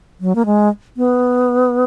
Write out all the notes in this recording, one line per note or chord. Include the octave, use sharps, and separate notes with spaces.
F#3
A#3
G#3
B3